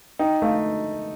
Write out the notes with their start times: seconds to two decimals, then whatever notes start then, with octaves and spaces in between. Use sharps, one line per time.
0.19 D#4 G5
0.42 A3 F5